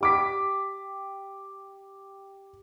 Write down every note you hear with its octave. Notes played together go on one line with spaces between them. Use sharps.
G4 D6 B6